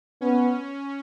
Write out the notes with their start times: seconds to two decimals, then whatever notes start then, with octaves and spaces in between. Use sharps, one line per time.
0.21 B3 C#4